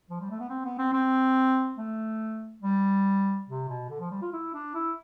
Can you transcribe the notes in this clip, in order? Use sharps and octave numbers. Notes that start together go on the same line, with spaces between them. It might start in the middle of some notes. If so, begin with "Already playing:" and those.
F3
G3
A3
B3
C4
B3
C4
C4
A3
G3
C3
B2
D3
F3
G3
F4
E4
D4
E4